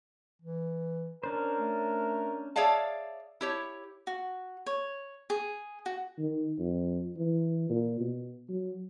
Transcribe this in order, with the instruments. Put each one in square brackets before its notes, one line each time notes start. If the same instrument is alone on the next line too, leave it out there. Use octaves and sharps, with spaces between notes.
[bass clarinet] E3
[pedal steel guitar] C#4 D4 C5 [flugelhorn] A#4
[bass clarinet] A3
[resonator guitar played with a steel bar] G#4 C#5 D5 E5 F5 A5
E4 G4 C#5
[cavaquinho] F#4
C#5
G#4
F#4
[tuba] D#3
F2
E3
A#2
B2
F#3